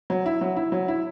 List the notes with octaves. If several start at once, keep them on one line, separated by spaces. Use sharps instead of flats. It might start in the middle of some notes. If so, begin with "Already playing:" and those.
F#3
E4
F#3
E4
F#3
E4